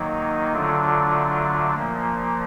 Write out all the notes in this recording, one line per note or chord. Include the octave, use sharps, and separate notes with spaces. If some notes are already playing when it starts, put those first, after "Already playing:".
Already playing: D#3 F#3 A#3 D#4
D3 F#3 A3 D4 F4
A#2 F3 A#3